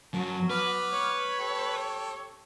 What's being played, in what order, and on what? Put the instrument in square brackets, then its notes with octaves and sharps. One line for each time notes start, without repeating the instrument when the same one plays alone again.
[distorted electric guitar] F#2 [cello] F#3 [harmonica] A5
[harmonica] B3 D6 F6 [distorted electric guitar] B4
[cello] C#5
[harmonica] G4 A4